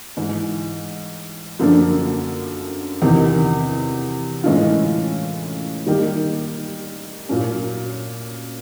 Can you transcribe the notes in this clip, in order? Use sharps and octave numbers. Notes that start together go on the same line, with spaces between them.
G#2 E3 G#3
F#2 D3 F3 A#3 D4
E2 C3 D#3
A2 E3 G#3 C#4 F4
D#3 G3 A#3 D#4 G4
A#2 F#3 A#3 C#4